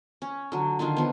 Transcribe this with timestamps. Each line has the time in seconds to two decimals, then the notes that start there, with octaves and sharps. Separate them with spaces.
0.22 C#4
0.52 D3 F#3
0.79 D3 D#3 D4 F4
0.97 F3 B3